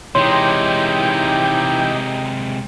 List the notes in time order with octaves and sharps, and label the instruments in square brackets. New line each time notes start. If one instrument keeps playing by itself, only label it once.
[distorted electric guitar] C3 G#3 [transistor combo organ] E3 G5 [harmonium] D#4 G4 [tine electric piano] C#5 C6